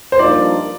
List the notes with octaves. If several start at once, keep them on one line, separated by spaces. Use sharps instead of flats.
C5
G2 F3 A#3 D#4 D5